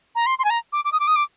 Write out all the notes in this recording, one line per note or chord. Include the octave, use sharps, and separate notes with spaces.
A#5
C6
C6
G#5
A#5
D6
D6
D#6
D6
D#6
D6